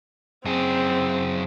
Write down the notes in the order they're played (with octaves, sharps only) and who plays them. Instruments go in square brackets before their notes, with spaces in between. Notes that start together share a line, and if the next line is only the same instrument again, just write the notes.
[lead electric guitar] F#2 G#4 [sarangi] C4